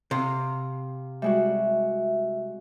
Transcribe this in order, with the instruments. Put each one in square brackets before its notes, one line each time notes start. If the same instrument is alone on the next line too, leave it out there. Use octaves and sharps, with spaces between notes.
[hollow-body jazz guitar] C3 [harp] F5
[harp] G3 G#3 F#4 [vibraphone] E5